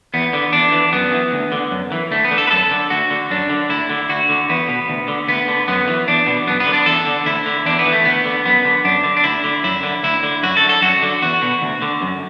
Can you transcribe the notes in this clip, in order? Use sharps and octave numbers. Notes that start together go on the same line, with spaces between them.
E2 B3
D3
E2 D4
E3
F#2 B3
E3
D2
D3
F#2
E3
D2 A3
B3
D3
A4
B4
F#2 A4
D3
D2 F#4
D3
F#2 D4
D3
D2 E4
D3
D2 F#4
D3
E2 B3
B2
D2
D3
D2 B3
D3
F#2 B3
E3
E2 D4
B2
F#2 B3
B3
D3
D4
E2 A4
D3
D2 E4
D3
E2 D4
B3
E3
A3
D2 B3
D3
F#2 B3
D3
F#2 D4
D3
D4
D2 E4
D3
F#2 E4
D3
D2 E4
D3
F#2 F#4
A4
D3
A4
F#2 F#4
D3
E2 F#4
B2
D2
D3
F#2